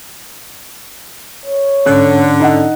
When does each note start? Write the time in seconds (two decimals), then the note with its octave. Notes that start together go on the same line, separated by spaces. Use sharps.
1.46 C#5
1.86 G#2 D3 C#4 F#6
2.40 D#4 D#5 F#5